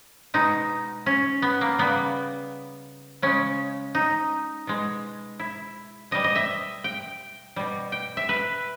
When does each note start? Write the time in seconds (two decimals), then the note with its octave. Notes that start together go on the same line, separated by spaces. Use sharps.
0.34 B2 G#3 D#4
1.06 C#4
1.42 B3
1.61 A#3
1.79 C#3 G3 B3
3.22 C#3 G#3 C#4
3.95 D#4
4.67 B2 G#3
5.39 E4
6.11 B2 G3 D#5
6.24 D#5
6.35 E5
6.84 G5
7.56 B2 G3
7.92 G5
8.17 E5
8.29 B4